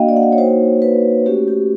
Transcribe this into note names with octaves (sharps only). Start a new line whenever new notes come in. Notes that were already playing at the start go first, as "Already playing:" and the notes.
Already playing: A#3 D4 F#4 D#5 F5 G5
D5
F#5
F5
C#5
A#3 D#4 F#4 C5
B4
A3 C#4 F#4 G4
G4